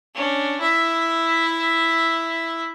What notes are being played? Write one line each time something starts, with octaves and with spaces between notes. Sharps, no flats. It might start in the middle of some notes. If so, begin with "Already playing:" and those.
C#4 D4
E4 E5